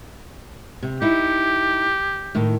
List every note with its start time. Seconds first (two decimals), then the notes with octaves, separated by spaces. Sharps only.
0.83 C3
1.02 D#4 E4 G4
2.35 A2 D#3